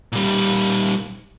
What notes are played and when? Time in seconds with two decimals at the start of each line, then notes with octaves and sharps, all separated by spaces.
0.12 A#2 G3